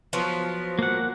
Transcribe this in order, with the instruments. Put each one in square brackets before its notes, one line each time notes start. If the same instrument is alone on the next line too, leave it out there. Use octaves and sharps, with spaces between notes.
[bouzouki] F3 F#3 B3
[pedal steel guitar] A#3 F#5